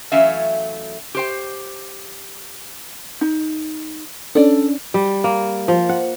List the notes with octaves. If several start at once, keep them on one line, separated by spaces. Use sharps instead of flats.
E3 F#3 A3 C#4 E5 F5
G4 C5 G5
D#4
C#4 D4 A4 D5
G3
A#3
F3
F#5